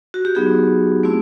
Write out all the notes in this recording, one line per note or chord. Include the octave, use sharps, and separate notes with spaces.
F#4
G4
F#3 B3 D#4 F#4 G#4
A3 C4 E4